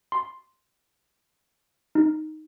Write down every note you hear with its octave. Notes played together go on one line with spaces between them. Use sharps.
C6
D#4